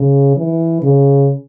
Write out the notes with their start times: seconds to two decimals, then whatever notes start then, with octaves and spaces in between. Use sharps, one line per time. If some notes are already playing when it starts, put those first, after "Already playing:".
Already playing: C#3
0.36 E3
0.82 C#3